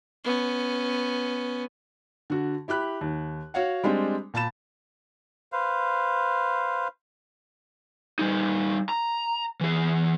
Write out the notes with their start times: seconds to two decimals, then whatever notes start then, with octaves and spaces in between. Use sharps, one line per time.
0.24 B3 C#4
2.30 D3 F#4
2.68 E4 G4 B5 F#6
3.01 D#2
3.54 F#4 C#5 F5 F#5
3.84 G3 G#3 C4 D4
4.34 A#2 A5 B5 A6 E7
5.52 B4 C5 F5
8.19 G3 D#4
8.89 A#5
9.61 E3 G#4